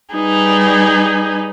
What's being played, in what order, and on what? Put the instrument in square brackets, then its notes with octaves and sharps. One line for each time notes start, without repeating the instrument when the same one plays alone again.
[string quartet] G3 D#4 G#4 B4